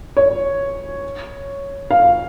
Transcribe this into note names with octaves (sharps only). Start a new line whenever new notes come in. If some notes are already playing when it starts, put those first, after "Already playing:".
C#5
F5